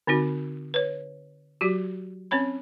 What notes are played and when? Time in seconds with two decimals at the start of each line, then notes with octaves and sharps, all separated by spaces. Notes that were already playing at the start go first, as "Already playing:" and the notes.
0.07 D3 C4 D#4 F#4
0.74 B4 C#5
1.61 F#3 F#4 G4
2.31 C4 C#4 C#5 B5